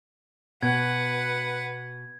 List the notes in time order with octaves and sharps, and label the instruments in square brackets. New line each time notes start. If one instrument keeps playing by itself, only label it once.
[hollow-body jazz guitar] B2 [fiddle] B4 F#5 [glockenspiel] G#6